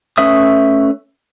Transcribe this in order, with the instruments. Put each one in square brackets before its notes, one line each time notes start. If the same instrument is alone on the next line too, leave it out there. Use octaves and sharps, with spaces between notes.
[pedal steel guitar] A3 C#4 B4 E5 D#6